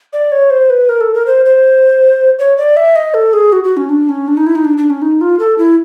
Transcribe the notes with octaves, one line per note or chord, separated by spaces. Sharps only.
D5
C#5
C5
B4
A#4
A4
A#4
C5
C5
C#5
D5
E5
D#5
A4
G#4
F#4
F#4
C#4
D4
C#4
D4
D#4
E4
D#4
D4
D4
C#4
D#4
F4
A4
E4